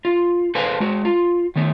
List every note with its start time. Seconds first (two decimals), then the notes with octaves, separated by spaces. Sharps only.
0.05 F4
0.55 A4 B4 C5 F5 G#5
0.80 G#3 F#4
1.05 F4
1.56 D#3 A3 B3